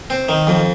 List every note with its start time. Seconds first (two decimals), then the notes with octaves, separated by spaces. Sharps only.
0.10 C4
0.29 D#3
0.47 F2